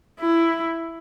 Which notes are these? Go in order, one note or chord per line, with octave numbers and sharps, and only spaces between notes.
E4